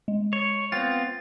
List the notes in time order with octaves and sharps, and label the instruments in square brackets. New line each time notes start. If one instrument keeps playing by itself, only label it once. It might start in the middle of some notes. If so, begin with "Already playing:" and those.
[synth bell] G#3
[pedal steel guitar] C#5
[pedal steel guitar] B3 C4 F4 [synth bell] A6